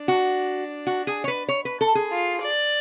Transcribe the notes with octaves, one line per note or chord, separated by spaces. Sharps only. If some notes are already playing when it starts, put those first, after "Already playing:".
Already playing: D4
F#4
F#4
G#4
C#5
B4
C#5
B4
A4
G#4
F4
D5